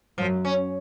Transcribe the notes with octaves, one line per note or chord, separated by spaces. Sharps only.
F#2 F3 F#3
C#4